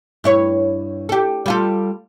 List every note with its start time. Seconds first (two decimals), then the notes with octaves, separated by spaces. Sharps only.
0.24 G2 E4 C#5
1.09 G4 A4
1.46 G3 F4 A4